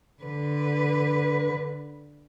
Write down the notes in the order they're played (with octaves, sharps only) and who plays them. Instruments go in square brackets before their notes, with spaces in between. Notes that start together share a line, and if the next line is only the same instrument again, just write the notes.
[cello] D3 B4